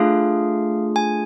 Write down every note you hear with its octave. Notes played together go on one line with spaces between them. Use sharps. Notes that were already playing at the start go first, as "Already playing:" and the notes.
Already playing: A3 D4 F4 G#4 F5
G#5